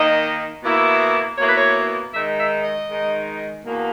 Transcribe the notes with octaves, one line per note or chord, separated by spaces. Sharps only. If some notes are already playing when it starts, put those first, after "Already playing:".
Already playing: D#3 A#3 D#4 D#5
B2 A#3 E4
B2 A#3 E4 C#5
B4
C#5
D#3 G#3 D#4 E5
E5
D#5
D#3 G#3 D#4
E2 B2 A#3